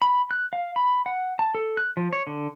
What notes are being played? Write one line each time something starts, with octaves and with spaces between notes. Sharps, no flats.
B5
F#6
F5
B5
F#5
A5
A4
F#6
F3
C#5
D3